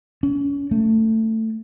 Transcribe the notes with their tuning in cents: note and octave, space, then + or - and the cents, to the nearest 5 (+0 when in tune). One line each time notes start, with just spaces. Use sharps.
C#4 +30
A3 +15